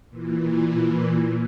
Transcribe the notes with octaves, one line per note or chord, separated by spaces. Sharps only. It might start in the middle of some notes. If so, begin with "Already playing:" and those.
A#2 E3